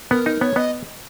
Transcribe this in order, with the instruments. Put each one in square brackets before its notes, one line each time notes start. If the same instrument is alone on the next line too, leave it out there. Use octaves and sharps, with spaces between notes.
[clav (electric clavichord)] B3 [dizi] A#4
[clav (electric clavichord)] D#4
[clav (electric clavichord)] B3 [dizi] C#5
[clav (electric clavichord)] B3 [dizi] D#5